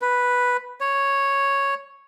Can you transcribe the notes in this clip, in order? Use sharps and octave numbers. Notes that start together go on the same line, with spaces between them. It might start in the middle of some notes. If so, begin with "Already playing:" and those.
B4
C#5